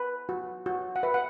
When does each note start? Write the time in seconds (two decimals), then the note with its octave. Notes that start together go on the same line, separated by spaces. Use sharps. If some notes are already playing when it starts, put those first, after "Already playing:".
Already playing: B4
0.29 F#4
0.66 F#4
0.96 F#5
1.03 B4 E5
1.14 F#5